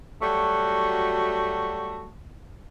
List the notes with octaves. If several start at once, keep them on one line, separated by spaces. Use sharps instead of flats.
F#3 G3 A3 F#4